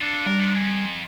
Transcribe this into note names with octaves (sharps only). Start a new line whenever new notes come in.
D4 F4 A4
G3 A#4
D#3 F3
F2 G#5